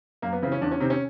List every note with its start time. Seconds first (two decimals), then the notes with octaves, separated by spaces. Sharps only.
0.22 F#2 A#3
0.32 B3
0.42 C#3 E3 C4
0.52 C#4
0.61 E2 D4
0.71 C#4
0.80 C3 D#3 C4
0.90 C#4